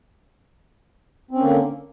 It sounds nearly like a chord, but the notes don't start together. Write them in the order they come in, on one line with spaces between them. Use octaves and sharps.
C4 C#4 A#3 D3